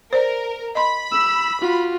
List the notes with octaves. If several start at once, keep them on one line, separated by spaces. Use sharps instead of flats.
A#4 C5 D5
D#5 B5 C6
E6
F4 F#4